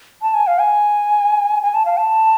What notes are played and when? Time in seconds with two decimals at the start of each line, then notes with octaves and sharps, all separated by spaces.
0.22 A5
0.34 G#5
0.47 F5
0.60 G#5
1.63 G#5
1.74 A5
1.85 F5
1.97 A5